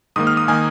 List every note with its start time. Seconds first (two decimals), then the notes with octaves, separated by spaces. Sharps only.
0.16 G#2 D#3 A#3 D#6
0.27 F6
0.37 D#6
0.48 D#3 A#3 G#5